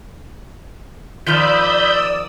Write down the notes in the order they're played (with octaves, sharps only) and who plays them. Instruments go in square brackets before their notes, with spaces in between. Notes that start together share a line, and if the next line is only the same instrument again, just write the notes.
[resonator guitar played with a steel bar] D#3 F3 F4 [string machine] D5 D#6 E6 [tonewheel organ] B5 G6